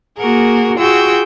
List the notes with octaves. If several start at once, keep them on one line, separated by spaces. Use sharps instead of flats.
A#3 F#4 G#4 A#4
F4 F#4 G#4 G5 E6